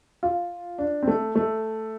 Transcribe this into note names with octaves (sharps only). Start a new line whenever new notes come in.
F4
D4
C4
A3
A3